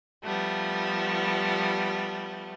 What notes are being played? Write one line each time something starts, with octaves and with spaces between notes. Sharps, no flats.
F3 G3 A3 B3